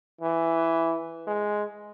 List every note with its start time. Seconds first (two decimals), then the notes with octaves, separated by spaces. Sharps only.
0.21 E3
1.27 G#3